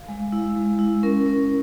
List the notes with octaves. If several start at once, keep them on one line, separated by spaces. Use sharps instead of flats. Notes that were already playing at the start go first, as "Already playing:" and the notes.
Already playing: F5
G#3
E4
G#3
E4
C#4 A#4
C#4